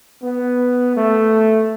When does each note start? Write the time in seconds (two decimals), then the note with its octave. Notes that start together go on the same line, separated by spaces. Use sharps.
0.23 B3
0.96 A3